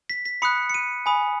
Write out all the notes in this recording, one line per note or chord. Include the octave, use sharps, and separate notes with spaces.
B6
B6
B5 D#6 F#6 C#7
C#7
D#7
G#5 B5 D#6